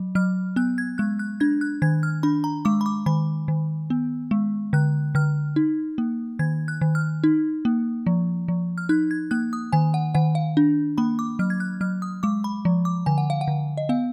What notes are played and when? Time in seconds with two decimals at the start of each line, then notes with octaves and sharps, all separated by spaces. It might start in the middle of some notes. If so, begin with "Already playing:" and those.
Already playing: F#3
0.15 F#3 F6
0.56 B3 F#6
0.78 G#6
0.98 G#3 F#6
1.19 F#6
1.40 D4 G#6
1.61 F#6
1.82 D#3 G#6
2.03 F6
2.23 D4 B5
2.44 A#5
2.65 G#3 D6
2.81 B5
2.86 D6
3.06 D#3 B5
3.48 D#3
3.90 B3
4.31 G#3
4.73 D3 F#6
5.15 D3 F6
5.56 D#4
5.98 A#3
6.39 D#3 G#6
6.68 F#6
6.81 D#3
6.95 F6
7.24 D#4
7.65 A#3
8.06 F3
8.48 F3
8.78 F6
8.89 D#4 F#6
9.11 G#6
9.31 A#3 F#6
9.53 D#6
9.72 D#3 G#5
9.94 F#5
10.15 D#3 F#5
10.35 F5
10.57 D4
10.98 A#3 B5
11.19 D6
11.39 F#3 F6
11.50 G#6
11.60 F#6
11.81 F#3 F6
12.02 D#6
12.23 G#3 D6
12.44 B5
12.65 F3
12.85 D6
13.06 D3 G#5
13.18 F#5
13.30 F5
13.41 F#5
13.48 D3
13.77 D#5
13.89 B3 F5